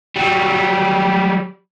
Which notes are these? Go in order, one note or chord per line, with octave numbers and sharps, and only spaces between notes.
F#3 G3